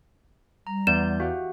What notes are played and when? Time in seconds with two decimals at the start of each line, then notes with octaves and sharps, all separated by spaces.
0.67 G3 A#5
0.87 E2 B3 D5 G6 E7
1.20 F#4 G4 F5 F#5